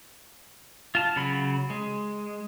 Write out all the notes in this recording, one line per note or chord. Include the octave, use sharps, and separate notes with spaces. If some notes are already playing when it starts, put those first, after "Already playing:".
F4 A5
C#3 F#3 B5
G#3